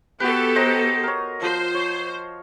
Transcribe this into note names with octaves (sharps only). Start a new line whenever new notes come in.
B3 F#4 G4 A4 B4
C5 D#5 A#5
A#4 C#5
F3 C5
C#5